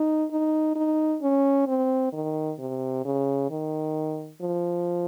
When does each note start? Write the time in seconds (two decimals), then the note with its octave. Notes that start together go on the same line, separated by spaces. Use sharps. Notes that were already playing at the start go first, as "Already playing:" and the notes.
Already playing: D#4
0.31 D#4
0.76 D#4
1.22 C#4
1.67 C4
2.13 D#3
2.59 C3
3.05 C#3
3.50 D#3
4.42 F3